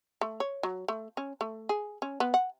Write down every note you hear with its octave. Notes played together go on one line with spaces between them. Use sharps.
A3
C#5
F#3
A3
C#4
A3
G#4
C#4
B3
F#5